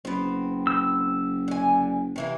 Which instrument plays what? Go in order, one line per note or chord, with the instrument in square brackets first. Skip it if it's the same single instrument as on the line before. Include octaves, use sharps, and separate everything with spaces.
[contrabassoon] F#1 [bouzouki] B3 C4
[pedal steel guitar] E6
[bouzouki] D3 G#5
C3 E3 A#3